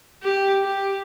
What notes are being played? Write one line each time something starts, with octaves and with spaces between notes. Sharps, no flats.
G4
G4